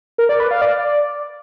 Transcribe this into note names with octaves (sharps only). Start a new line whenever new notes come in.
A#4
D5
B4
F5
D5